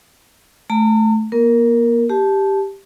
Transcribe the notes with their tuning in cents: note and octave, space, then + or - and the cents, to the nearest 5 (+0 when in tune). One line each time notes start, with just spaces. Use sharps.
A3 -20 A#5 -40
A#3 +35 A#4 +0
G4 +0 A5 -15